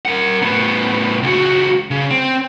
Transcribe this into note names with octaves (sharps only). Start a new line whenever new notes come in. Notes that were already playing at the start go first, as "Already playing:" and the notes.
A#4 F#5
A2 B3
C#2 F#4
C#3
C4